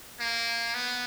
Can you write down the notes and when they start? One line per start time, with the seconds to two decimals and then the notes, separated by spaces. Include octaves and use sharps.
0.19 A#3
0.74 B3